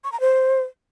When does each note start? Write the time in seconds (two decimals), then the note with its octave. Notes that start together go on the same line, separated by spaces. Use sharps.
0.04 C#6
0.12 A#5
0.20 C5